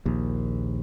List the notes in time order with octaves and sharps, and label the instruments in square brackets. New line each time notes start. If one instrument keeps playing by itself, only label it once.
[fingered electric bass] A#1 D#2